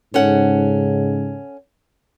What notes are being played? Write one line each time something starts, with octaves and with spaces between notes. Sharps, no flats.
G#2 C#3 C#4 A4 F#5